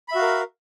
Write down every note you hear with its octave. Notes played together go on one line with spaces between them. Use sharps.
F#4 A#4 E5 F5 B5